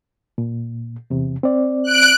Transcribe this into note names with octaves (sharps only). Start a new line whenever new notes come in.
A#2
E2 C3
C4 D5
F#6 D7